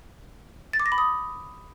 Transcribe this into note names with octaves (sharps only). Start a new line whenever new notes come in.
A6
D6
A#6
B5
D#6